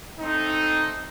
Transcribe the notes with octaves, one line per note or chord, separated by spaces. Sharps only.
A3 C4 D#4